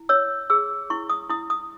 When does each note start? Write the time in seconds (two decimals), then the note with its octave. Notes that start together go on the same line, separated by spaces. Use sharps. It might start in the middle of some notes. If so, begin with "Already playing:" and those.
Already playing: E4
0.09 C#5 E6
0.50 G#4 E6
0.90 E4 C#6
1.10 D#6
1.30 E4 D#6
1.50 D#6